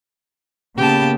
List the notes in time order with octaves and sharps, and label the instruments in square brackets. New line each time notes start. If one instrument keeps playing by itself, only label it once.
[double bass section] C#3 A#3 B3 [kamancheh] G4 A5